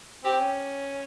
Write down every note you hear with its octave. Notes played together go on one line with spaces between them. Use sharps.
C4 G4
C#4